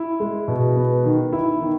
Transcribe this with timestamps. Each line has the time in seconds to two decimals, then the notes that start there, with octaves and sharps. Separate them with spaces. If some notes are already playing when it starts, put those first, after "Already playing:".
Already playing: E4
0.20 G#3
0.48 B2
0.76 B3
1.05 D#3
1.33 E4
1.61 D#3